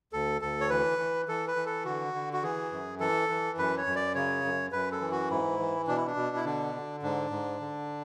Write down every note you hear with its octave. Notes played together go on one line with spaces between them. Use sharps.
D2 A4
D2 A4
C#5
E3 B4
E3
E3 A4
B4
E3
A4
D3 F#4
D3
F#4
E3 G#4
F#2
E3 A4
E3
F#2 B4
C#5
F#2
D5
C#3 C#5
F#2
F#2 B4
A4
E3
F#4
G#2 E4
E3
B2 D4
E4
D4
B2
E4
D3 D4
D3
G#2 D4
G#2
D3